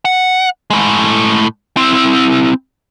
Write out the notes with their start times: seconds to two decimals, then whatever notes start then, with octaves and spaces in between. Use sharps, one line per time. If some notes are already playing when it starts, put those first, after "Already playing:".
0.05 F#5
0.70 A2 G#3
1.77 C4 E4